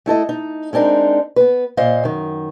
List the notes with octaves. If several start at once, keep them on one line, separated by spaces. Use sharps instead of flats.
A3 E4 A4 D#5
D#4
G#3 C4 D4 D#4 A#4
B3 B4
A#2 C5 D#5 F5
F#2 D#3